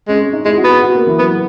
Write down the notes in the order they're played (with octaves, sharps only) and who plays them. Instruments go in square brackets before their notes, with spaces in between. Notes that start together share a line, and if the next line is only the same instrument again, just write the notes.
[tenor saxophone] G#3 [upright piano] C#4
[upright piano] C#4
D#4
[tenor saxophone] G#3 [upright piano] E4
[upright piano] G#4
F#4
[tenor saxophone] B3
[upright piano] G#4
F#4
A#3
E3
[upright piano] F#3 [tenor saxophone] B3